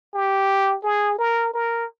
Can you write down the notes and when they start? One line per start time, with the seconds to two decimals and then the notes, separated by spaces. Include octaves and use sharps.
0.14 G4
0.84 G#4
1.19 A#4
1.54 A#4